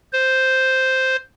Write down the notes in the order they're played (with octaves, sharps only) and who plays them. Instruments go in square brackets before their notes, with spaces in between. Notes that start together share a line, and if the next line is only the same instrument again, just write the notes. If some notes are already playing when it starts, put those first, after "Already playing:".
[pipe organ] C5